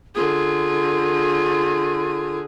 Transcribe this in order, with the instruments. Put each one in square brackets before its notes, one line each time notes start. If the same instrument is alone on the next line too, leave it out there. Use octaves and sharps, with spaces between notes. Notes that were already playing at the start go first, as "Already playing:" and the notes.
[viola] D3 G#4 [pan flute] F4